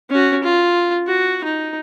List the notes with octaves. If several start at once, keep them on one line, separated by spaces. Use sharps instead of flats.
C#4 F#4
F4
F#4
D#4